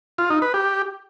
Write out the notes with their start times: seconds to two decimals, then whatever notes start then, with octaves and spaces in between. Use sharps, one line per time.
0.18 F4
0.30 D#4
0.42 B4
0.54 G4